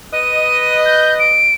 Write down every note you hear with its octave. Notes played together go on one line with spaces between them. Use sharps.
B4 D#5 D#7
G6
D7